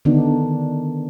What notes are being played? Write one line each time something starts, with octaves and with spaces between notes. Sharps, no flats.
D3 D#3 B3 D4 D#4